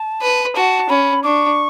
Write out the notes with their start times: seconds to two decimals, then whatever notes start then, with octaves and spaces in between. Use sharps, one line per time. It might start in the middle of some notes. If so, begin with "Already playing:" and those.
Already playing: A5
0.22 B4
0.56 F#4 A5
0.89 C#4 B5
1.23 D4 C#6 D6